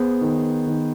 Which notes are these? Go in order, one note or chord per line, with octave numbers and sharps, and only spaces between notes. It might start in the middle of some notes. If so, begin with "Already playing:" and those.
Already playing: B3 G#4 C5
D#3
D#3